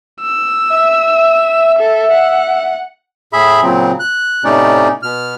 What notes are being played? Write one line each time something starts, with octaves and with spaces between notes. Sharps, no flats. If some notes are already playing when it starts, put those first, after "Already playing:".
E6
E5
A4
F#5
A2 G#4 E5 B5
A#2 C#3 F#3 C4
F#6
A2 C3 A3 C#4 D#4 D5
B2 F6